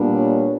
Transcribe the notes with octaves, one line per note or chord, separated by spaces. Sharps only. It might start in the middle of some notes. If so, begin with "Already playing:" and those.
Already playing: A#2 G3 B3 D4
C#5